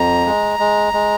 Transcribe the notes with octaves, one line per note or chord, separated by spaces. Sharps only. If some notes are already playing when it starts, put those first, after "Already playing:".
Already playing: F2 A#5
G#3
G#3
G#3